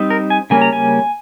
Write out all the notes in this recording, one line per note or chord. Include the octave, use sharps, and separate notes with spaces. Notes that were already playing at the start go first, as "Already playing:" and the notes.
Already playing: G3 C4 D#4
A#4
G#5
C#3 G3 A#3 C#4 G#5
A#5
G#5